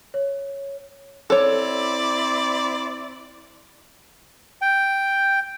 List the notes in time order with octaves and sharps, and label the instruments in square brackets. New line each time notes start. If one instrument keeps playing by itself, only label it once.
[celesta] C#5
[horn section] C4 E4 D5 [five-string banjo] A4 C#5
[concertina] G5